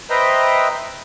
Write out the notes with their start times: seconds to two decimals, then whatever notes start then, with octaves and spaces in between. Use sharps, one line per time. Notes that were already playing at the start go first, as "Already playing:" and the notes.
0.10 B4 C5 D#5 E5 G5 A#5